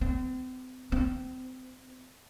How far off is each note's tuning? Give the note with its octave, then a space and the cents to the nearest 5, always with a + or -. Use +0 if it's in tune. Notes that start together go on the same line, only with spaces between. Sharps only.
C4 -40
C4 -30